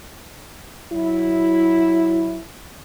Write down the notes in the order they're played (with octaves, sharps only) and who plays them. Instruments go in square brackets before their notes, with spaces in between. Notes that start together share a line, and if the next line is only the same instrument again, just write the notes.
[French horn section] F#3 E4